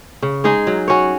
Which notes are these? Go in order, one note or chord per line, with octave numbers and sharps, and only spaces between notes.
C#3
G#3 D#4 G#4
F#3
C#4 F#4 C#5